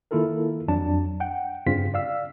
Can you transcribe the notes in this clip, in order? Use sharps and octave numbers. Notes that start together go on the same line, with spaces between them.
D#3 A#3 E4 F4 A4 A#4
F2 F#3 D4 A5
F#5 G5
G2 C#3 C4 F4 B6
D5 F5 E6